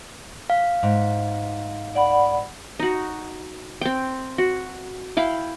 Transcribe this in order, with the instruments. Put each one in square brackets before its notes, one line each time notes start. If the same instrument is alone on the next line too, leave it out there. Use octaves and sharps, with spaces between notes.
[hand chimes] F5
[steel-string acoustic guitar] G#2
[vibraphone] D5 F#5 B5
[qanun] D#4 F#4
C4 G5
F#4
E4 F5 G5 B5